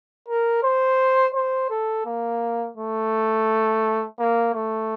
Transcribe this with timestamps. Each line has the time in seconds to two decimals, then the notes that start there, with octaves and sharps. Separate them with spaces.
0.28 A#4
0.63 C5
1.35 C5
1.70 A4
2.05 A#3
2.77 A3
4.19 A#3
4.54 A3